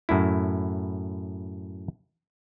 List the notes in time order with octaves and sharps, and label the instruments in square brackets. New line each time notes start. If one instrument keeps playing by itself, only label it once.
[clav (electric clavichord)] F#2 A2 E4